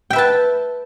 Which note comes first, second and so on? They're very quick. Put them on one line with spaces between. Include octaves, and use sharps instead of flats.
G5 E5 B4 A5